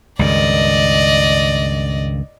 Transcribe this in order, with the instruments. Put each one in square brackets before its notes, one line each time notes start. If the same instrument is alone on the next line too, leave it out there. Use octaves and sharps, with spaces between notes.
[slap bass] C#2 G2 D#3 [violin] D5 D#5